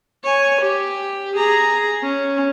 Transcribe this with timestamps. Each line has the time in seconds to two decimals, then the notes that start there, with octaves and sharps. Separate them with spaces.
0.24 C#5 G#5
0.61 G4
1.37 G#4 A#5
2.03 C#4